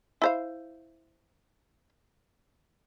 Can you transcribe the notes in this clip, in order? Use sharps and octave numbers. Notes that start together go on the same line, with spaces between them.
E4 C5 F5